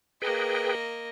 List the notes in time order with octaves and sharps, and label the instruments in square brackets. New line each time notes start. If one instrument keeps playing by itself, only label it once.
[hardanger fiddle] A#3 D#5 [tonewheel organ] G#4 B4 G5